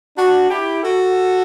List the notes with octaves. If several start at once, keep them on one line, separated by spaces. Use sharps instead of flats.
D4 F#4
E4 G4
F#4 A4